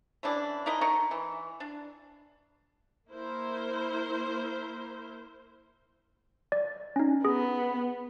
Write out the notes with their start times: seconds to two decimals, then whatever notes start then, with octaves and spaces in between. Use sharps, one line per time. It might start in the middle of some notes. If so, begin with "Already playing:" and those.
0.23 C#3 E3 D4 E4
0.66 D#4 E4 A#4 D#5
0.81 D#4 A#4 C#6
1.11 E3
1.60 D4
3.10 A#3 E4 A#4 C5
6.52 D5
6.96 C#4 D#4
7.25 B3 G#4